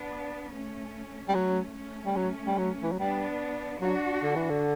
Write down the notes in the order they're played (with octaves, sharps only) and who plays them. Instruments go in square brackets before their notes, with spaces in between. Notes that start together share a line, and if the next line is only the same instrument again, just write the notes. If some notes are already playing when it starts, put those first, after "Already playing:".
Already playing: [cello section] B3 D4
A3 C#4
[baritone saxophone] G3
[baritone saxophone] F#3 [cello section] A3 C#4
[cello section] A3 C#4
[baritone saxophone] G3
F#3
G3
F#3
E3
F#3
[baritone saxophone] G3 [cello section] B3 D4
[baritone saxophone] F#3 [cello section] D4 F#4
[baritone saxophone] D3
E3
D3